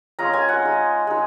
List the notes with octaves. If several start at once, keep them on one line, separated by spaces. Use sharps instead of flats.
G#3 C#4 F4 A#5
G#5
F#5
G#3 D#4
G#3 D#4